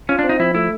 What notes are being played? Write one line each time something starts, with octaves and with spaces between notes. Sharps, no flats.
C#4 F4
D4
C4
D#4
F3 E4
A3 E4